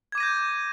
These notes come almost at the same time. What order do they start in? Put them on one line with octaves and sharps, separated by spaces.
G#6 D6 D#7 A#6 G6